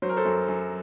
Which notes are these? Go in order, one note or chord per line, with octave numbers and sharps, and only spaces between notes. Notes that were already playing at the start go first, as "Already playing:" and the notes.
F#3 C5
A#4
A4 C5
F#2
F#2